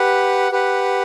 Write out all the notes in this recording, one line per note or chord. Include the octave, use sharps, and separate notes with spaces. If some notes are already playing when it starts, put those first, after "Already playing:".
Already playing: G4 B4 F#5
G4 B4 F#5